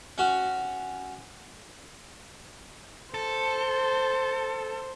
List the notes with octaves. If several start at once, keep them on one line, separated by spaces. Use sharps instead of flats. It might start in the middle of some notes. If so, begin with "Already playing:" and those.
C#4 F#4
A4 C5